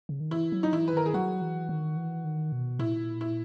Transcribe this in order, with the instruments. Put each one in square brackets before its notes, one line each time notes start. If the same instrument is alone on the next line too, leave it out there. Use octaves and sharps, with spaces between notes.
[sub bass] C#3
D#3
[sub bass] E3 [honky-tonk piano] E4
[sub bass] F#3
[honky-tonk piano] D#4
[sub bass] E3 [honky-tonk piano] E4
[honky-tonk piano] B4
[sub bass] D#3 [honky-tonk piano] A#4
[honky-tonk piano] G#4
[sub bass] F#3 [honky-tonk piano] F#4
[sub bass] E3
D#3
E3
D#3
B2
[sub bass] A#2 [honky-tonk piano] E4
[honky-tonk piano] E4